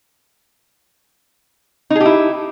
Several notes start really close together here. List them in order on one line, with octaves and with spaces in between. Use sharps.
D#4 G#4 G4 E4